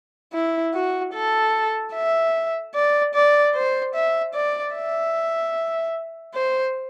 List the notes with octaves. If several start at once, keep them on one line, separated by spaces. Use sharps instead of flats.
E4
F#4
A4
E5
D5
D5
C5
E5
D5
E5
C5